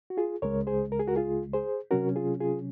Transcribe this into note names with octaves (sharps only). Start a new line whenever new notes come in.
F#4
F4 G#4
C#2 C#3 G#3 A#4 C#5
G#4 C5
A#4
G#4
F#4 A#4
F4 G#4
G#4 C5
C3 F#3 C#4 F#4 A#4
F4 G#4
F4 G#4